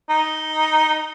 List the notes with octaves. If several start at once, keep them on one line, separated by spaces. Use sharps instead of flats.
D#4